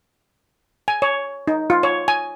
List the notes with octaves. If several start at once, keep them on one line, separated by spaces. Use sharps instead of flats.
G#5
C#5
D#4
F4
C#5
G#5